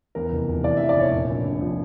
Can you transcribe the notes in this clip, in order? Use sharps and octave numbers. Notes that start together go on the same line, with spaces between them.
E2 A#4
F1
F1
E3 D5
E2 E5
D5
F1 C#5
A#2
A#1
A#1
F3